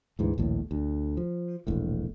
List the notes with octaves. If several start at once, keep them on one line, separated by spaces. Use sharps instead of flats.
D2 G#2 E3
A#1 D#2 A2
D2
F3
E1 A#1 A2